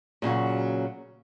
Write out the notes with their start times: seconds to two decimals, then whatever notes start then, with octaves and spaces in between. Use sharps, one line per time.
0.22 A#2 C#3 F#3 F#4